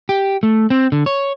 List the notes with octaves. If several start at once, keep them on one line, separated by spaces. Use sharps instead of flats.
G4
A3
C4
D3
C#5